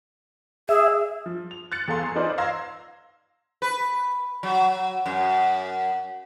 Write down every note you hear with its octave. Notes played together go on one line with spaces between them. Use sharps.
G#4 E5
F3
F7
F#6 A6 C#7
E2 G#4 A4 F5 A#5 C6
D#4 F4 B4 C5 D5 D#5
F5 A#5 C6 E6 G#6 A#6
B4
F#3
F#2